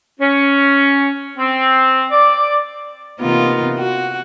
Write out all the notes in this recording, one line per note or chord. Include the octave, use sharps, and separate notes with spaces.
C#4
C4
D5
C3 E3 A#3 B3 D#4 F4
F#4